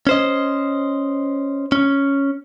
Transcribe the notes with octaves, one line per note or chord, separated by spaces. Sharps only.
C#4 C5 D#5
C#4